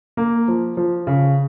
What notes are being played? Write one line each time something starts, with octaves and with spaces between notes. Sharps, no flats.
A#3
F3
F3
C#3